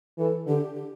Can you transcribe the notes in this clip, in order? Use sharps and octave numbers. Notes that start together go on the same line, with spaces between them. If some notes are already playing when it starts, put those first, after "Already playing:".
E3 A4
D3 G4
G4